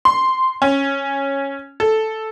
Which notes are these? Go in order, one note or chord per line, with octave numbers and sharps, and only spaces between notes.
C6
C#4
A4